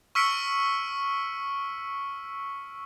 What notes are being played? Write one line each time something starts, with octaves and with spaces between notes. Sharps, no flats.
C#6 E6 F6 B6 C#7 D7